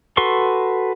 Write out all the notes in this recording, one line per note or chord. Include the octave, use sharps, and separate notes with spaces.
F#4 A4 B4 C6 C#6